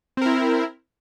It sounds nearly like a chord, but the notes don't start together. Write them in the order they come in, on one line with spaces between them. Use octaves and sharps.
C4 A#4 E4